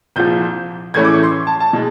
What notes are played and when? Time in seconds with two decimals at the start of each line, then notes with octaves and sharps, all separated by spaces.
0.16 C2 A#2 F3 G6
0.94 A2 E3 A3 C#4 E4 G#6
1.05 D6
1.13 C#6
1.23 C6
1.47 A5
1.60 A5
1.73 B2 G#3